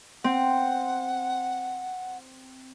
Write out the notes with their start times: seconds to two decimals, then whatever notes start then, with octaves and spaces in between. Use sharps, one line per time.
0.24 C4 F#5